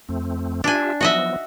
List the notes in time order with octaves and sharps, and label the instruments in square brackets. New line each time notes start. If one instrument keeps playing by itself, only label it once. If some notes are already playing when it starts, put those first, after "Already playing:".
[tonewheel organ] F2 A3 C4
[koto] D4 G#5 [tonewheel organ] F4 G4 E5
[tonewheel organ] F3 F#3 B3 [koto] F#4 D#5 E5